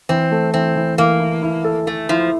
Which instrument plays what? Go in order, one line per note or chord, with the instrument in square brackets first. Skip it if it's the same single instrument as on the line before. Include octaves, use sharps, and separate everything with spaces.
[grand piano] E3 [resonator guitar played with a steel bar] C4
[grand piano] A3
[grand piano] E3 [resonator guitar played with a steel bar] C4
[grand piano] E3
[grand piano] E3 [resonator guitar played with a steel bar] A#3
[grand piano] E4
E4
A4
[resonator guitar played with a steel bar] A3 [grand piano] A4
[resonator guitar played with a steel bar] F3 [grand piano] E4